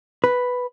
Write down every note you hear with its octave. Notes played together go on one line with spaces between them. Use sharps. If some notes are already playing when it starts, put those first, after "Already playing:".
B4